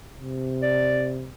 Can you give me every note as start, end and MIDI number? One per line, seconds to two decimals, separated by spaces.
0.19 1.32 48
0.62 1.13 74